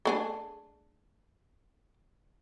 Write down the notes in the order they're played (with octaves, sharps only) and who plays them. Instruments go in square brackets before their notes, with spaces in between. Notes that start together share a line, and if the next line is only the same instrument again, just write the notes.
[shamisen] A3 D4 G#4